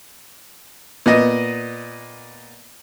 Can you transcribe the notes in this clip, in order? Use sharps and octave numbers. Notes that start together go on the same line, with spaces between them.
A#2 B3 D#5